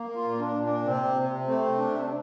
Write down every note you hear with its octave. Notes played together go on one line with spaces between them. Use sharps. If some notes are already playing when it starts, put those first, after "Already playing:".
Already playing: A#3
F4
A#2
D4
A#2
D4
C3 C4
C3
A3 C4
C3 D4
D4